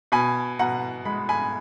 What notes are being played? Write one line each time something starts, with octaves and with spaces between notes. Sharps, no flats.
B2 G#5 B5
B2 F#5 A#5
G#3 B5
G#5 B5